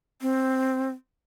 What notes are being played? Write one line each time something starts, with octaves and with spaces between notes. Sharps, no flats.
C4